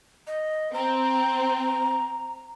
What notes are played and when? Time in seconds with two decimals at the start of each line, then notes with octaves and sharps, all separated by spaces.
0.27 D#5
0.74 C4 A#5